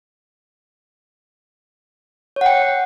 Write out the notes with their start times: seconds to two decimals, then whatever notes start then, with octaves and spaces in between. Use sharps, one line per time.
2.36 C#5
2.41 F#5
2.46 G5